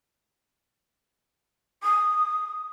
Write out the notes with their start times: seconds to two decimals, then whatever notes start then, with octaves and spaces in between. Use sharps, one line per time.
1.82 D#6